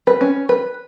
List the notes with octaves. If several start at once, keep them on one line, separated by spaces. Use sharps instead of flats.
B4
C#4
B4